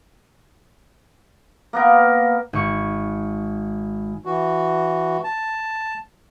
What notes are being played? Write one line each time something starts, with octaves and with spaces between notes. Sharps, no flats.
A#3 B3 A#4
G#1 C#6
E3 F#4
A5